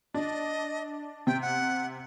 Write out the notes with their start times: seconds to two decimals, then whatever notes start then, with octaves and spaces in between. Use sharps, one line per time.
0.14 D4 D#5
1.27 C3 G5
1.41 F#5